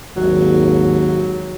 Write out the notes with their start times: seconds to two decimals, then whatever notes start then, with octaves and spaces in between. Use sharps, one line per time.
0.16 G#1 D#2 F#3